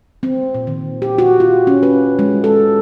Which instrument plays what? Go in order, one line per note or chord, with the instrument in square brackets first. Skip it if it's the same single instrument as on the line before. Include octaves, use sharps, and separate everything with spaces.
[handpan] C4
A#2
D#3
G4
F#4
F4
C#4
B4
G#3
A4